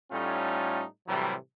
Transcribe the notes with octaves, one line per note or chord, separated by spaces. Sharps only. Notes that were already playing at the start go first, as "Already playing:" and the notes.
A2 G3 A3 C#4 D#4 F4
A2 C3 E3 F#3 G3